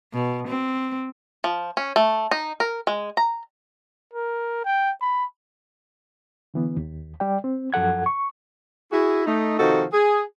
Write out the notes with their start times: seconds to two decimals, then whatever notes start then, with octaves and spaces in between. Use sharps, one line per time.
0.13 B2
0.48 C4
1.44 F3
1.77 C#4
1.96 A3
2.31 D#4
2.60 A#4
2.87 G#3
3.17 A#5
4.13 A#4
4.65 G5
5.01 B5
6.54 D3 E3 B3
6.77 D#2
7.20 G3 D5 G5
7.44 C4
7.73 F#2 F3 A4 F#5 G#6
8.06 C#6
8.91 E4 F#4 G#4
9.26 A3 D#4
9.59 C3 D#3 F3 D#4 F#4 A4
9.92 G#4